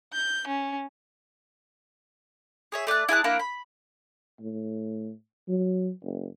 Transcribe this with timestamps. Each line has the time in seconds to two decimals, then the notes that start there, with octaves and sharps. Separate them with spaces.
0.13 G6
0.47 C#4
2.72 G#4 C#5 E5
2.87 A3 D5 G5 F#6
3.09 E4 G#4 A5 F#6
3.24 A#3 D4 E4 F#5
3.40 B5
4.40 A2
5.48 F#3
6.04 F#1